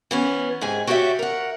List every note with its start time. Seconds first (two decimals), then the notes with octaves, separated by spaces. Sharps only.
0.11 E3 B3 C#4
0.61 G#2 C3 G#4 G#5
0.87 F#4 G4 C#5 D5 E5
1.19 A#4 F#5